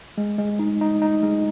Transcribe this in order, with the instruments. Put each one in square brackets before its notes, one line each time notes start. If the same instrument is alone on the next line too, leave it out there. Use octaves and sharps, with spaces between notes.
[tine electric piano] G#3
G#3
D#4
D#4
D#4
G#3